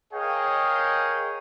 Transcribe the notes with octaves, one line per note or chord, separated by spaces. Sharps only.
G#4 A#4 C#5 D#5 F5 G5